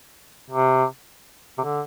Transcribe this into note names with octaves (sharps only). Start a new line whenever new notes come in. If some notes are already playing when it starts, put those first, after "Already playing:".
C3
C3
D3